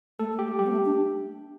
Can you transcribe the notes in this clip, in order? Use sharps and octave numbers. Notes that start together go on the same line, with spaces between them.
A3 A4
A3
G4
A3
G3 G4
B3
A3
D4